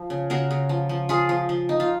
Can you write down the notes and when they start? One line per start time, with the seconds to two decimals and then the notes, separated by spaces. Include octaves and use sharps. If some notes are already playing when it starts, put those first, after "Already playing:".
Already playing: F3
0.10 C#3
0.30 C#3 F#4 A#4
0.51 C#3
0.69 F3
0.89 F3
1.09 F3 F4 G#4
1.29 F3
1.49 F3
1.69 D#4
1.80 F4